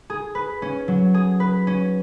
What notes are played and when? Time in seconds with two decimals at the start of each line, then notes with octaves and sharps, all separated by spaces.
0.10 G#4
0.35 B4
0.62 C#4
0.88 F#3
1.14 G#4
1.40 B4
1.67 C#4